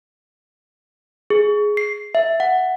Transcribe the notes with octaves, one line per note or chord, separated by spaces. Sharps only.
G#4
C7
E5
F#5